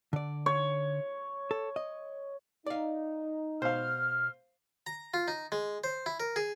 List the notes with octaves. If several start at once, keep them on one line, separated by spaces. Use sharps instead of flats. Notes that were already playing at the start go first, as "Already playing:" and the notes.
D3 D5
C#5
A4
D#5
D#4 D5 F5
B2 C5 F5 F6
A#5
F4
D#4
G#3
C5
E4
A#4
G#4